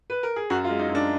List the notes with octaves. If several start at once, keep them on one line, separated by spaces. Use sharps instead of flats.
B4
A#4
G#4
F#2 F#4
F4
G#3
D#4
F#2
D4